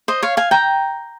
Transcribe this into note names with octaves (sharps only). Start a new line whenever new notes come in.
C5 D#5
C#5 F5
F5 G#5
G5 A#5